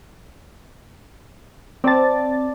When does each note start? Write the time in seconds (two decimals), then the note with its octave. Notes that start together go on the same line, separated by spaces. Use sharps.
1.84 C4 D5 A5 A6